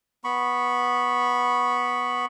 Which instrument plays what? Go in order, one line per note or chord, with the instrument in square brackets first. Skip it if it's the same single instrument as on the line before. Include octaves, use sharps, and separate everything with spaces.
[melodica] B3 B5 C#6